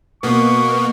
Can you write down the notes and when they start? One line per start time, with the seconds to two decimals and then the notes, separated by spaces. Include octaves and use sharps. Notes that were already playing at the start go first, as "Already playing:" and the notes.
0.23 B2 A#3 B3 C#6